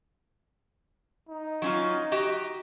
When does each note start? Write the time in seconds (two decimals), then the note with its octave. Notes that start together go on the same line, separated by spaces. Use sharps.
1.29 D#4
1.62 F#3 C#4 F4
2.12 F#4 G4 D#5